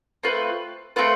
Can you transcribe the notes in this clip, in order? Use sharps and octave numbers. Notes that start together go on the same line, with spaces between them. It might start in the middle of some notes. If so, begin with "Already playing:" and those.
A3 C4 F4 B4
A3 C4 F4 B4